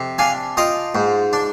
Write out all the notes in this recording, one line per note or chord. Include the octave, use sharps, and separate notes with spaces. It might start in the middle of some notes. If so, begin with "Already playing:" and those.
Already playing: F2 C3
D4 F5 G#5
F4 D#5 G5
G#2
D4